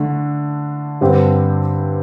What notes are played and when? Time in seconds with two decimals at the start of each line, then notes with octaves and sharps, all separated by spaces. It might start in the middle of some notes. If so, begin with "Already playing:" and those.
Already playing: D3 A3 D4
1.01 G2 D3 G3 C4 G4